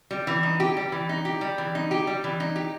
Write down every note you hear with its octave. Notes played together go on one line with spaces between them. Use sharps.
G3
E3
D#4
G4
G3
E3
D#4
G4
G3
E3
D#4
G4
G3
E3
D#4
G4